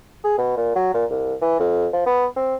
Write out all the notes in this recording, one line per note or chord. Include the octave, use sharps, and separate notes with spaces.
G#4
B2
A#2
F#3
A#2
C2
E3
F2
F3
B3
C4